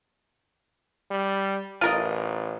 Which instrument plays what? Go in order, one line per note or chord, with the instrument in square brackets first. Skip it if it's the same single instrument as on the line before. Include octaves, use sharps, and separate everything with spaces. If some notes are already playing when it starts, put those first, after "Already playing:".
[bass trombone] G3
[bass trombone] A1 [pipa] F4 A#4 D#5